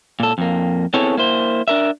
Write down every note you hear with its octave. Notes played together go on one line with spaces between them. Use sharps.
A#2 A4
F2 A#3
B3 C4 E4 G#4 A4 C#5
A#3 E4 C5
D4 A#4 E5